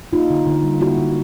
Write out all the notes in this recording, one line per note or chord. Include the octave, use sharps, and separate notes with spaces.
A#3 D#4 F4
D3
D3
G3
A#3 E4 F#4
D3